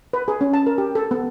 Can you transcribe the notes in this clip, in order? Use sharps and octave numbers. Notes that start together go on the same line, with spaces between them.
B4
G#4
C#4
A5
A#4
G4
A4
B3